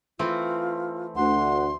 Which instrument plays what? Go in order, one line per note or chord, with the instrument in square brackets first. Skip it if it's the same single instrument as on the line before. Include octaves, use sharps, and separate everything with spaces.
[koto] E3 A3 C4 [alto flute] F4
[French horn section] D2 [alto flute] F#5 [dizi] C6